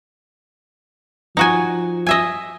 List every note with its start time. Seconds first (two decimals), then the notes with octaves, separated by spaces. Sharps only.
1.37 F3 D#4 F#4 G#5
2.07 D#5 E5 G#5